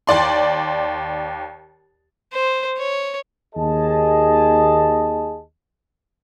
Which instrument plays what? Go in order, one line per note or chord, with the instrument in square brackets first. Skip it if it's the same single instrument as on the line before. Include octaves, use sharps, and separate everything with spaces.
[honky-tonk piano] D#2 D5 C6
[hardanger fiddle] C5
C#5
[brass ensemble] D#2 G#4 D#5 A5